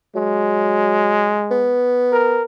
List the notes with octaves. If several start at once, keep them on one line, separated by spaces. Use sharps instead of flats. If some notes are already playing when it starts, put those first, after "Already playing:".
F#3 G#3
B3
A#4